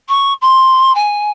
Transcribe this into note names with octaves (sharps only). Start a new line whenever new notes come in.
C#6
C6
G#5